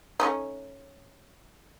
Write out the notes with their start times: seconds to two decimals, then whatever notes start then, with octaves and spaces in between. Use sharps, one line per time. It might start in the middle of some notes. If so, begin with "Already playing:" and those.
0.20 A3 C#4 D#4